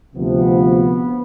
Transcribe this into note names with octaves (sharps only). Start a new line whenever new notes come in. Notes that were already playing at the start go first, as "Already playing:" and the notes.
D2 C3 F3 B3